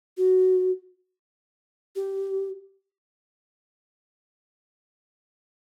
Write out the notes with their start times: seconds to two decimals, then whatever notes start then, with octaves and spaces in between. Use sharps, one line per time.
0.17 F#4
1.96 G4